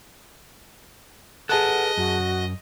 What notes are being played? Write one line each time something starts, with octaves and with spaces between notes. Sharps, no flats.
G#4 A4 B4 D#5 F#5 A5 F#6
F#2 F#4